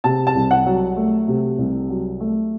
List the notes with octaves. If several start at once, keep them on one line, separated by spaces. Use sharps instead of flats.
C3 A5
A5
C2
F#5
F#3
A3
C3
C2
F#3
A3